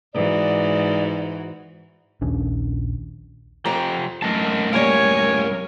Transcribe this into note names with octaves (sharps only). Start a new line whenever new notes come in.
G#2 E3 F#4 D5
A#1 D#2 C#4 D4
F2 F3 G4 C5 A#5
F#2 A2 A#4 D#5 A5
G3 A#3 A#4 C#5 F5 G#5